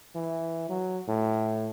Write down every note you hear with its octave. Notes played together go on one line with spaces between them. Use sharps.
E3
F#3
A2